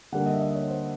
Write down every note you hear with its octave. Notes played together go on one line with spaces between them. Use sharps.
D3 G3 A#3 F#5
D#5
E5
D#5
C#5
C5